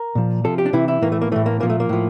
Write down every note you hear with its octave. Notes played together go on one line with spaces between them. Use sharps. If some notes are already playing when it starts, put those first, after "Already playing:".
Already playing: A#4
A#2 F3
C3 F3 A4
G4
D4
C3 E3 E4
E4
A2 E3 A#3
A3
A#3
A2 E3 A3
A#3
A#2 F3 A#3
A3
A#3
A2 F3